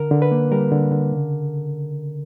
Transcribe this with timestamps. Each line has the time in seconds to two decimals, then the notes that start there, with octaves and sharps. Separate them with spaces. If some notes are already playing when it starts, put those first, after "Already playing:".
Already playing: D3 A#4
0.11 D3
0.22 B4
0.32 A#3
0.52 G3 A#4
0.72 D3
0.92 D3
1.12 C#3